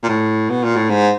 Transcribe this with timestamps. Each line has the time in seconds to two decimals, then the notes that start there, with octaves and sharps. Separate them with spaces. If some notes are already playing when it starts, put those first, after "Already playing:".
0.03 A#2
0.09 A2
0.50 B2
0.64 A#2
0.76 A2
0.89 G#2